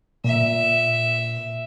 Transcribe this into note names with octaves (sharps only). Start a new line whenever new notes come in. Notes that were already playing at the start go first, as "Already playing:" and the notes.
A#2 E5